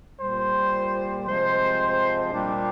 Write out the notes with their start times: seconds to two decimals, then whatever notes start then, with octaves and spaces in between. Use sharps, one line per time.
0.19 A#2 G3 C5
1.26 C3 F3 G#3 C5
2.32 A#2 G3 D4